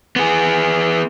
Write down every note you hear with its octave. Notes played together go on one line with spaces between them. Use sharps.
B3 G#4